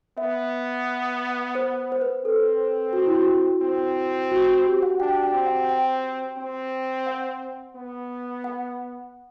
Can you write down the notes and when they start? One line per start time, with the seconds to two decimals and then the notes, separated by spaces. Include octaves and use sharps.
0.18 B3 E5
1.55 C5
1.92 C5
2.01 B4
2.25 C4 A4
2.93 F#4
3.06 E4
3.18 F#4
3.62 C4
4.32 F#4
4.48 F#4
4.66 G4
4.82 F#5
5.00 D4 G5
5.23 G5
5.34 C4
5.46 F#5
5.69 G5
6.38 C4
7.06 F#5
7.76 B3
8.44 F#5